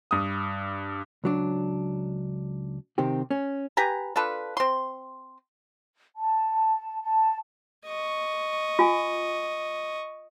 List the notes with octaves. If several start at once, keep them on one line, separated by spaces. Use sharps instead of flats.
G2 D#6
C#2 F#3 D4
C3 D#3 C4 G4
C#4
G4 B4 G#5 A#5
D4 F4 A4 B4
C4 C6
A5
A5
D#5 C#6
F4 G#5